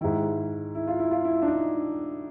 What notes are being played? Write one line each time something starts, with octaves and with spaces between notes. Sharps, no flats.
G#2 D#3 E4
E4
F4
E4
F4
E4
D4
D#4